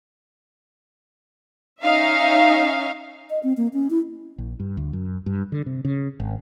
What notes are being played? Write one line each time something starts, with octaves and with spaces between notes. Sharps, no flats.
C#4 D#4 E5 F5
D#5
C4
A#3
C#4
E4
A#1
G2
D2
F#2
G2
D3
C3
C#3
G#1